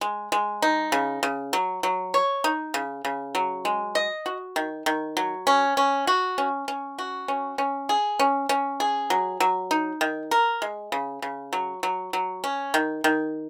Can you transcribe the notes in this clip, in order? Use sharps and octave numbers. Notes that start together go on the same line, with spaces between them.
G#3
G#3
D#4
C#3
C#3
F#3
F#3
C#5
D#4
C#3
C#3
F#3
G#3
D#5
F#4
D#3
D#3
F#3
C#4
C#4
F#4
C#4
C#4
F#4
C#4
C#4
G#4
C#4
C#4
G#4
F#3
F#3
D#4
D#3
A#4
G#3
C#3
C#3
F#3
F#3
F#3
C#4
D#3
D#3